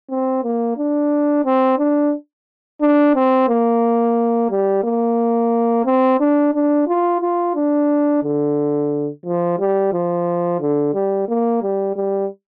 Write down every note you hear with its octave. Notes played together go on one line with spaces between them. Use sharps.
C4
A#3
D4
C4
D4
D4
C4
A#3
G3
A#3
C4
D4
D4
F4
F4
D4
D3
F3
G3
F3
D3
G3
A#3
G3
G3